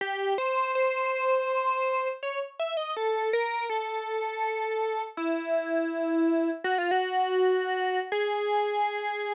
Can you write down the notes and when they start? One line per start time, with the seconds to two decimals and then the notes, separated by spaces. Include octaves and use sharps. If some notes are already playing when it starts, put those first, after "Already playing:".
0.01 G4
0.38 C5
0.75 C5
2.23 C#5
2.59 E5
2.77 D#5
2.97 A4
3.33 A#4
3.70 A4
5.17 E4
6.64 F#4
6.78 F4
6.91 F#4
8.12 G#4